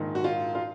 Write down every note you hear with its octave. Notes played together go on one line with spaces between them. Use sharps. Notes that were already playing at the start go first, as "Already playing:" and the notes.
Already playing: A#1 G#2 D#3
F#4
F4
F4